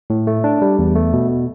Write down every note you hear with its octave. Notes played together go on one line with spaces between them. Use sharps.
A2
A3
D4
G3
E2
A3
B2